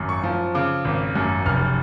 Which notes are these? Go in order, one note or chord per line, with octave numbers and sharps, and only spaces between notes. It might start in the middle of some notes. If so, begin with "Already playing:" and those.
Already playing: G#1 F#2
C#6
F3
C#3 D6
G#1
F#2
F1 F6